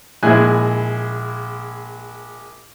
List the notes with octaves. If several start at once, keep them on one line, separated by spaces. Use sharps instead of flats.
A#1 G#3 E4 G#4 G#5 F#6